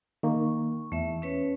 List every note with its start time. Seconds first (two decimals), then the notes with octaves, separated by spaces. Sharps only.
0.23 D#3 A#3 C#6
0.92 E2 A3 E5
1.22 C#4 B4 C#5